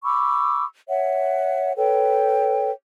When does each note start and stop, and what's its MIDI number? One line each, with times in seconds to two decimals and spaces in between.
0.04 0.64 83
0.04 0.64 85
0.04 0.64 86
0.04 0.64 88
0.88 1.73 73
0.88 1.73 76
0.88 1.73 78
1.77 2.70 69
1.77 2.70 71
1.77 2.70 73
1.77 2.70 79